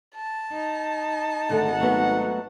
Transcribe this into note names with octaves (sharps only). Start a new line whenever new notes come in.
A5
D#4
G#1 D3 A3 A4 F#5
F#3 A3 B3